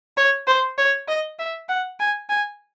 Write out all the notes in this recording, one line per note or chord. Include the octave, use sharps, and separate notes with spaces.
C#5
C5
C#5
D#5
E5
F#5
G#5
G#5